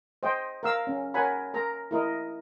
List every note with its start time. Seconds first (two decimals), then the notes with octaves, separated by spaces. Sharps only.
0.23 C5 D#5 G5
0.63 A#4 F5 E6
0.87 C#4
1.14 A#4 C#5 F#5 G#5 B5
1.54 A#4 A#5
1.91 E4 A#4 D#5